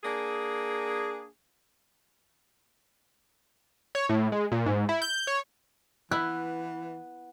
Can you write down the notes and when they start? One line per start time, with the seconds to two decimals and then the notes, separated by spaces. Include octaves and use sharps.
0.04 A#3 D4 G#4
3.95 C#5
4.09 A2
4.32 G#3
4.52 A#2
4.66 G#2
4.89 E4
5.02 G6
5.27 C#5
6.11 E3 B3 E4 F#6